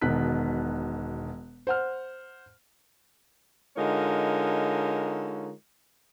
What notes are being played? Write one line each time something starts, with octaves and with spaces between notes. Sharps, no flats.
E1 B2 D#3 D#4 F#6 B6
C5 F#5 F6
D3 G#3 D#4 F4 A#4 C#5